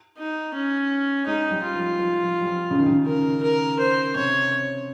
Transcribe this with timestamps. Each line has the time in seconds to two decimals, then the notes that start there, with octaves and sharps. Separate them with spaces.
0.18 D#4
0.54 C#4
1.26 G#3 D#4
1.51 G3
1.63 F4
1.75 F3
1.99 F3
2.23 F3
2.41 G3
2.47 F3
2.71 C#3
2.79 D#3
2.86 C#3
3.06 A#4
3.42 A#4
3.79 C5
4.15 C3 C#5